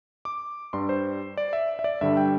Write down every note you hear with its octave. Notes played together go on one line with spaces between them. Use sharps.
D6
G2 G3 C6
C5
D5
E5
E5
D5
G2 D3 G3 E5
G5